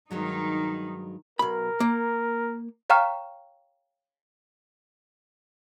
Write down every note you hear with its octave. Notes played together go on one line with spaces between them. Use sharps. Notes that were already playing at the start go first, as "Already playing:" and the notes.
G2 D#3 F#3 G#3 D#4
B1 A#4 B5
A#3
C#5 F5 G5 A#5 C#6 F6